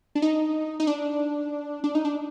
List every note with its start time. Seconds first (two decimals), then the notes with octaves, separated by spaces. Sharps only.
0.15 D4
0.22 D#4
0.80 D#4
0.87 D4
1.84 D4
1.95 D#4
2.05 D4